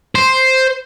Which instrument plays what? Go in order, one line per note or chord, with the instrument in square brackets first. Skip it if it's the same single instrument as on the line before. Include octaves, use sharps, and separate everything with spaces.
[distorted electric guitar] C5